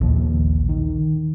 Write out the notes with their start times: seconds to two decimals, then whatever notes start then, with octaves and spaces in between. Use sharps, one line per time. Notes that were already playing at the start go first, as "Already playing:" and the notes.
0.01 A#1 D#2
0.69 D#3